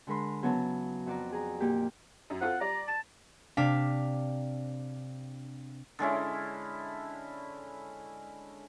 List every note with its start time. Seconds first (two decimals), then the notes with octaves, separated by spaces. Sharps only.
0.07 D3 G#3 A#4 B5 C6
0.42 C#3 F#3 B3 E4 C#5 A5
1.06 F2 F#4 D5 A#5
1.32 G#4 A#5
1.60 A#2 A#3 D#4 G4
2.30 F#2
2.41 C4 F4 A4 F#5
2.61 G3 D5 A#5
2.88 A5 E7
3.57 C3 D4 F5 B6
5.99 D3 G#3 C#4 E4